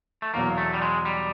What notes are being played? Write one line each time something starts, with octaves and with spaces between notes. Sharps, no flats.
A3
E2 B2 F#3 A#3
A3
G3
G#3
G3